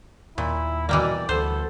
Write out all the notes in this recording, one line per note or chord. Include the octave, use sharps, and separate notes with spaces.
D#2 A#2 E4
B2 E3 G3 A#3 D5
D2 B3 A4 C5